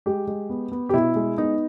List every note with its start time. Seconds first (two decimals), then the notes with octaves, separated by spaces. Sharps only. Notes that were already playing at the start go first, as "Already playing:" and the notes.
0.06 G#3 G4
0.27 G#3
0.49 B3
0.72 B3
0.89 G4
0.94 B2 E4
1.16 G#3
1.38 B3 D#4